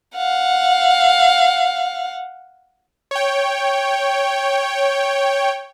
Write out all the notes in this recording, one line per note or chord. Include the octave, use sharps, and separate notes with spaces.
F5 F#5
C#5 G5